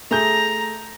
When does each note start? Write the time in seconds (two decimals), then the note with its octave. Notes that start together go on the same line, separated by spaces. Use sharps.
0.11 A3 G#4 A#5 G6